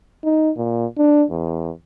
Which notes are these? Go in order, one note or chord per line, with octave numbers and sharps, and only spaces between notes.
D#4
A#2
D4
E2